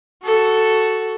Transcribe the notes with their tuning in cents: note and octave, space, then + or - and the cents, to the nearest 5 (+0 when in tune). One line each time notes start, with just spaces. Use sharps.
F#4 +5 A4 +0